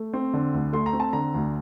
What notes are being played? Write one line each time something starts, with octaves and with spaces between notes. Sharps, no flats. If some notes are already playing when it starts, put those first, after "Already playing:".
Already playing: A3
C4
D3
D2
A3 C6
A#5
C4
A5
D3 A#5
D2